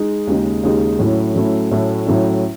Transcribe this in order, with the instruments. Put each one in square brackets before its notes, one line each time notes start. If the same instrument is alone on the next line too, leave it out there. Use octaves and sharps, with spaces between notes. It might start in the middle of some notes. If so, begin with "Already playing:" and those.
Already playing: [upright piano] G#3 D#4
D#2 C#3 G#3 D#4
D#2 C#3 G#3 D#4
A2 F#3 A3 C#4 E4
A2 F#3 A3 C#4 E4
A2 F#3 A3 C#4 E4
A2 F#3 A3 C#4 E4